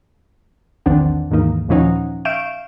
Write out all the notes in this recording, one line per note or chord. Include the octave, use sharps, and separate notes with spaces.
A#1 E2 D#3 C4 D4 F#5
D#2 G#2 E3 A#3 D#4
D#2 A#2 F3 C#4 D#4 F#5
E5 F5 C#6 G6 D7 E7